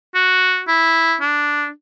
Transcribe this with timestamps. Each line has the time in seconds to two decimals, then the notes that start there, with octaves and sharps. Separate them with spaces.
0.15 F#4
0.68 E4
1.21 D4